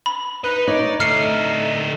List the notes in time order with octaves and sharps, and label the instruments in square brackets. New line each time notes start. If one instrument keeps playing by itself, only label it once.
[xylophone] B5
[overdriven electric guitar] D#4 D#5 [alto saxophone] B4
[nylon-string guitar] D#4 [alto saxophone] C#5 [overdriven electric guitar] D5
[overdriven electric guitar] D3 D#5 [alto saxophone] A3 [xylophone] F6 C7 C#7